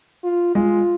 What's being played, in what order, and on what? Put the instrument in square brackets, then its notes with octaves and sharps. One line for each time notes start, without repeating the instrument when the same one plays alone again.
[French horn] F4
[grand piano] G#3 [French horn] F4